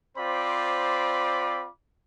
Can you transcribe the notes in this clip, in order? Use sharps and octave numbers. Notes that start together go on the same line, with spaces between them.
C4 F4 C5 D5 B5 D6